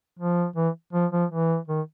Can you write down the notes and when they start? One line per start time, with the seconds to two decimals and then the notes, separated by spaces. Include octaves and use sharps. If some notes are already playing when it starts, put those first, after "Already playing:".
0.19 F3
0.56 E3
0.93 F3
1.12 F3
1.31 E3
1.68 D#3